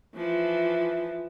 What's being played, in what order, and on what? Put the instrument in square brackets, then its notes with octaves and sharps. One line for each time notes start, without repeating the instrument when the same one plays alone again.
[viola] E3 F3